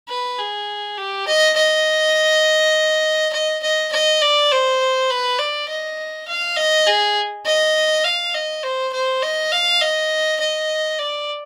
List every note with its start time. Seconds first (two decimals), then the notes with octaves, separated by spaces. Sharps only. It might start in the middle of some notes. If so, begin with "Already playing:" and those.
0.09 B4
0.39 G#4
0.97 G4
1.27 D#5
1.56 D#5
3.33 D#5
3.63 D#5
3.92 D#5
4.21 D5
4.51 C5
5.10 B4
5.39 D5
5.69 D#5
6.28 F5
6.57 D#5
6.87 G#4
7.46 D#5
8.04 F5
8.34 D#5
8.63 C5
8.93 C5
9.22 D#5
9.52 F5
9.81 D#5
10.40 D#5
10.99 D5